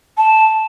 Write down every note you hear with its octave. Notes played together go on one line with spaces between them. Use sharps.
A5